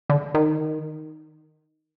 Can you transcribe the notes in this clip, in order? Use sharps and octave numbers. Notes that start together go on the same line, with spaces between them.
D3
D#3